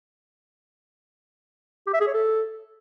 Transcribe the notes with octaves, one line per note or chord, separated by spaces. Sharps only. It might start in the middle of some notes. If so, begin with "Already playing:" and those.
G4
E5
G#4
C#5
A4